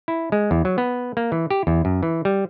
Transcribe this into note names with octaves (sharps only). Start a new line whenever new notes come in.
E4
G#3
E2
F#3
B3
A#3
E3
G4
E2
F#2
E3
G3